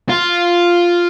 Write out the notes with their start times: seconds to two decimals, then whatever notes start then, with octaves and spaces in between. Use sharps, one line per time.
0.09 F4